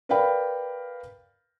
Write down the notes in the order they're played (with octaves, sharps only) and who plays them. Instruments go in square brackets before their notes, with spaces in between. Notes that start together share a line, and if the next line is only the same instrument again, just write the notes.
[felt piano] A#4 B4 D5 F5 G5 B5